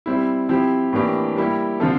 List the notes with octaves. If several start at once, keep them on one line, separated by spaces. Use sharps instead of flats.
G3 C4 E4
F3 C4 E4 G4
A2 E3 A#3 D4 G4
G3 A#3 E4 G4
D3 F3 C4 F4 A4